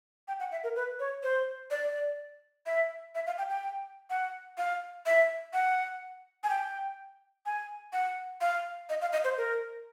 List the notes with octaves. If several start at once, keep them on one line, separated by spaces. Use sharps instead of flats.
G5
F#5
E5
A#4
B4
C#5
C5
D5
E5
E5
F5
G5
G5
F#5
F5
E5
F#5
G#5
G5
G#5
F#5
F5
D#5
F5
D#5
C5
A#4